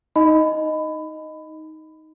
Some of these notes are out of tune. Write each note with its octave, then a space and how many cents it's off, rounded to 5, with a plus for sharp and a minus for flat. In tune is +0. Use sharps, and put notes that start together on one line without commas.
D#4 +10 D#5 +0 B5 +20